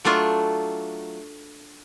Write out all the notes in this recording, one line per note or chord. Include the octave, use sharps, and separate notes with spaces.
F#3 A3 D4 F4